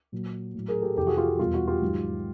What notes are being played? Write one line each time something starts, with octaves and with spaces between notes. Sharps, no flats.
A#2 F#3
A2 F#3
G#4 A#4
G4 A4
F2 C3 E3 G4 A4
F#4 G#4
F4 G4
F4
E2 B2 G3 F4
F#4
F4 G4
G#2 D#3 F#3